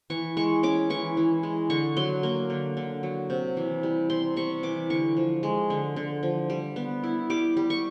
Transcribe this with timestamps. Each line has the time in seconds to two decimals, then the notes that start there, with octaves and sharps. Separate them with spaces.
0.10 E3 C#6
0.37 G#3 C#6
0.63 C#4 D6
0.90 E3 C#6
1.17 E3
1.43 G#3
1.70 D3 C#6
1.97 F#3 C6
2.23 A#3
2.50 D3
2.77 D3
3.03 F#3
3.30 C3
3.57 E3
3.83 G3
4.10 C3 C6
4.36 C3 C#6
4.63 E3 D6
4.90 D3 C#6
5.17 F3
5.43 G#3
5.70 D3
5.96 D3
6.23 F3
6.50 G3
6.76 B3
7.04 E4
7.30 G3 D6
7.57 G3
7.70 C#6